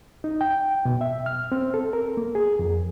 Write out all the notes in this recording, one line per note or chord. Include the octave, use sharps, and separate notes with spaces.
D#4
G5
B2
E5
F6
C4
A4
A#4
A#3
G#4
F2